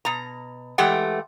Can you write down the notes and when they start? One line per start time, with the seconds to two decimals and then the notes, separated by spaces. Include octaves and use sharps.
0.05 B2 A#5
0.78 E3 G#3 A3 G4 F#5 G5